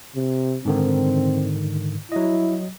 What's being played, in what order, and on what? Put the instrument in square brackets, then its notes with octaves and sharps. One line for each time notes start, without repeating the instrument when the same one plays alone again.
[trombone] C3
[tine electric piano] G#2 D3 D#3 [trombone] C4
[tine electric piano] F#3 D#5 [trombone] E4